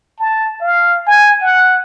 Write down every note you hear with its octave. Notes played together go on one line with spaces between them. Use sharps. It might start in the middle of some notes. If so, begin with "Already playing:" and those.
A5
F5
G#5
F#5